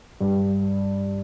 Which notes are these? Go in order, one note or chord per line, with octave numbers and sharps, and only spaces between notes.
G2